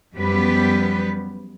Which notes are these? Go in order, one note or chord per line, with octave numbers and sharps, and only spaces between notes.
F#2 F3 G3 B3 G4 B4